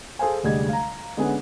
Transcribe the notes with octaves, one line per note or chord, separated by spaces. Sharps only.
G#4 A4 C5 F5 G#5
F1 D2 G3 G#3 D#5 G#6
F5 A#5
D3 G#3 B3 C#4 G#4